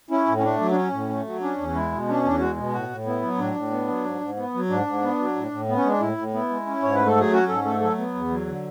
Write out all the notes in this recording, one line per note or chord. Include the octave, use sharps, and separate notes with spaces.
C#4 E4
A2
C#4
A3 D4
F#3
D4
C#4
A2
A3
F#3
C#4 D4
E2
G#3 E4
B2
C#4 D4
E2 D4
G#3 F#4
B2
A2 F#4
A2
B3 E4
F#3
A2 D4
A2
B3
F#3
G#2
G#2
B3
F#3
G#2 D4
G#2
B3
F#3
A2
A2
B3
C#4
G#3 D4
A2 E4
A2
B3 E4
G#3
C#4
G#2 C#5
B4
A3
A4
F#3 G#4
C#4 F#4
G#2 A4
A3 A4
F#3 A4
B3
E2
F#3
D3